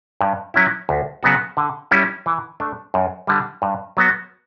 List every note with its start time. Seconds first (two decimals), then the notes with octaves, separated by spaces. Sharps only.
0.21 G2
0.54 F#3 C#4 E4
0.89 D2
1.23 C#3 F#3 B3 F#4
1.57 D3
1.91 G3 C#4 E4
2.26 E3
2.60 A3 D4
2.94 F#2
3.27 D3 G3
3.62 G2
3.97 F#3 B3 F#4